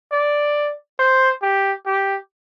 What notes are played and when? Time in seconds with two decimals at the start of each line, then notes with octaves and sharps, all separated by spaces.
0.12 D5
0.99 C5
1.42 G4
1.86 G4